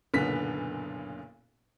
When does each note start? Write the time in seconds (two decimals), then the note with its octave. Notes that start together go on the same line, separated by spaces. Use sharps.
0.14 F#1 B1 A#2 D3 B3 B6